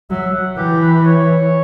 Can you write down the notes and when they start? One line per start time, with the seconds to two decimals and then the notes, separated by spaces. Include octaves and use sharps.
0.10 F#3 E5
0.33 F#5
0.57 E3 G4
0.81 B4
1.05 C#5